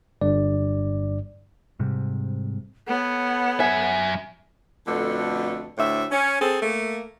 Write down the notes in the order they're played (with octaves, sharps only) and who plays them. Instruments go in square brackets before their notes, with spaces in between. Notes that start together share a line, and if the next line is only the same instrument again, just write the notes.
[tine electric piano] G1 G2 D5
[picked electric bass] G#2 C3 G3
[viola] B3 [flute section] A4 C#5 F#5
[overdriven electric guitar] F#2 E5 [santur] G#5
[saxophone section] F2 B2 D3 A3
D2 A2 E5
C#4
C4 G#4 A4
A3 A#3